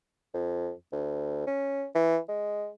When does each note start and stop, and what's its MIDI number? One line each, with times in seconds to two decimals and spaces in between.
0.34 0.72 41
0.92 1.46 38
1.47 1.85 61
1.95 2.18 52
2.29 2.69 56